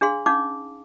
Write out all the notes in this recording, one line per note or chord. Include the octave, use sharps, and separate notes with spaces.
D4 G#4 F5 C6
C#4 D#4 F5 D6